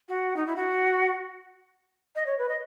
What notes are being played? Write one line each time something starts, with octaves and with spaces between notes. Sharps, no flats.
F#4
D#4
E4
F#4
D#5
C#5
B4
D#5